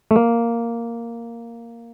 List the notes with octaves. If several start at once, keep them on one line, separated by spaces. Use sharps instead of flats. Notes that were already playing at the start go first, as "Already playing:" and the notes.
A3
A#3